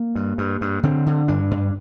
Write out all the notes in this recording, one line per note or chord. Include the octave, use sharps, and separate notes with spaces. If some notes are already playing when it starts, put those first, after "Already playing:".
Already playing: A#3
G2
G2
G2
D3 C4
D3
G2 D4
G2